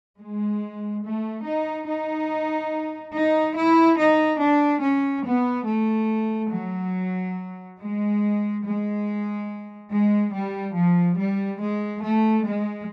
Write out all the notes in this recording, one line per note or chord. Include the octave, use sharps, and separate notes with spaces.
G#3
A3
D#4
D#4
D#4
E4
D#4
D4
C#4
B3
A3
F#3
G#3
G#3
G#3
G3
F3
G3
G#3
A3
G#3